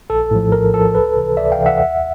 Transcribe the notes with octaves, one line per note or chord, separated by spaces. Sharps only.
A#1 A4
A2 F3
A#1 A#4
A2 F3 A4
C#2 A4 B4
C3 E3
C#2 D5 E5
F5 G5
C3 E3
E5 F#5
D#2